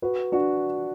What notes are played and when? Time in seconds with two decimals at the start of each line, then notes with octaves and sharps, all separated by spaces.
0.02 F#4 B4
0.32 D4 F#4